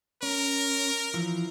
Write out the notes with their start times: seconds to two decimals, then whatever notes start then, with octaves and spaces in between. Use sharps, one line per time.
0.23 C#4 A#4
1.14 E3 F3